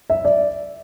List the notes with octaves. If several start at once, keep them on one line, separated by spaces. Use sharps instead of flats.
E5
D5